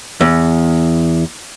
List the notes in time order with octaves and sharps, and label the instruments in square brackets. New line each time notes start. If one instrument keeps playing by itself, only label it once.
[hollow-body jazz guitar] E2